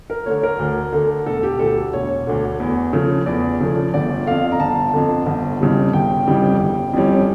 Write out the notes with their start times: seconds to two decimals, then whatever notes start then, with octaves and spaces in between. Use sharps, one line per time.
0.10 A#4
0.26 D3 A3 C#5
0.43 A#4
0.59 D2
0.93 D3 A3
1.26 E1 A4
1.43 G4
1.59 D2 D3 A4
1.93 E1 C#5
2.27 D2 D3
2.60 E2
2.93 C#3 F3 A3
3.26 E2 D5
3.60 C#3 F3 A3
3.94 G1 D5
4.26 F2 D3 F5
4.52 A#5
4.60 G1 A5
4.94 F2 D3
5.26 G1
5.60 F2 C#3 E3 G3
5.93 G1 G5
6.27 F2 C#3 E3 G3
6.60 G1
6.93 F2 E3 G3 C#4